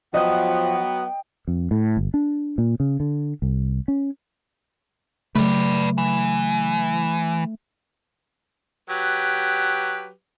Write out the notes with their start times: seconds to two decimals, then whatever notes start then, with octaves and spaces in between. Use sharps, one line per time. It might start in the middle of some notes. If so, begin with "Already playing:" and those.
0.14 F3 F#3 B3 D#5 G5 F#6
1.48 F2
1.71 A2
1.97 G1
2.14 D4
2.58 A#2
2.80 C#3
3.00 D3
3.42 C2
3.88 C#4
5.35 C#3 F#3 A3 B4 D5
5.98 E3
8.90 F#3 G4 B4